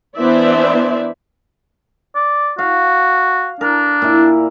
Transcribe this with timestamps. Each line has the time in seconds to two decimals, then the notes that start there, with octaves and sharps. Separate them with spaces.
0.16 E3 B3 D4 C5 D5 E5
2.15 D5
2.59 F#4 F5
3.61 D4 A#4
4.02 A#2 E4